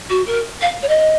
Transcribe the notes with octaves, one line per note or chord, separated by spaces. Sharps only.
F#4
A#4
F5
C#5
D#5